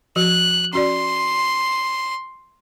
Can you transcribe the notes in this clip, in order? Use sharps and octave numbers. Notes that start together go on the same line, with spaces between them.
F3 F#4 F#6
C#4 F#4 D5 C6